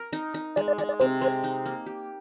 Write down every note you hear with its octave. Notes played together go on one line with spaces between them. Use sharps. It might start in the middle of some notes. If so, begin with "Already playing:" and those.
Already playing: A#4
D#4
D#4
G#3 D5
D5
G#3 D5
D5
C3 C5
G#3 C5
D#4
A#3
G4